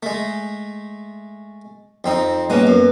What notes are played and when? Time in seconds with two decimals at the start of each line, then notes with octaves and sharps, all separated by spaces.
0.03 G#3 A3
2.04 F2 C4 D#4
2.50 G#3 A#3 B3 C#4
2.67 F#2